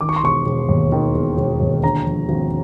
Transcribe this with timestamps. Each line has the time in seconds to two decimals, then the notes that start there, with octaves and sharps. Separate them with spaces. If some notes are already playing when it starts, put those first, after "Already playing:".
0.01 D#3 D6
0.09 C#6
0.16 C6
0.23 E1 C#6
0.46 E1
0.69 D#2
0.92 D#3
1.14 E1
1.37 E1
1.61 D#2
1.83 D3 A#5
2.06 F3
2.29 G#1